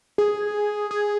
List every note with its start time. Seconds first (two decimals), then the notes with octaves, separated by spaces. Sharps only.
0.18 G#4
0.91 G#4